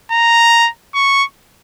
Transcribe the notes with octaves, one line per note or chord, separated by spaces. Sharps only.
A#5
C#6